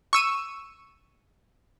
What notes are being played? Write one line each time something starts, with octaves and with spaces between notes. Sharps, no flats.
C#6 E6 D#7